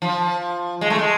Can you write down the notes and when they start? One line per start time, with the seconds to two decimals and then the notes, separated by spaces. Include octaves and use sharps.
0.02 F3
0.81 G#3
0.90 A3
0.99 G#3